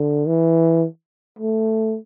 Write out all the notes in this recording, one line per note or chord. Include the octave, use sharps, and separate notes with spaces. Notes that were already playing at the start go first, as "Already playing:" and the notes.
Already playing: D3
E3
A3